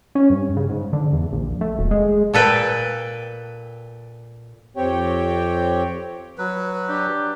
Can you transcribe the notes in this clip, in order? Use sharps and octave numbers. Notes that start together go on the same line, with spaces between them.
C#4
G2
C#3
G#2
D3
E2
A#1
A3
E1
G#3
A#2 A4 B4 G5
F2 C4 G4 C#5 G5
F#3 B4
D4 G4